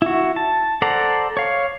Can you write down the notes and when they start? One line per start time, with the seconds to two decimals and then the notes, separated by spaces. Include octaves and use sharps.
0.02 E4 F#4
0.36 A5
0.82 A4 C5 D5 F#5 A#5
1.37 C#5 F5